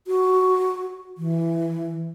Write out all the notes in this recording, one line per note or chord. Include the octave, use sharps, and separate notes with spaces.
F#4
E3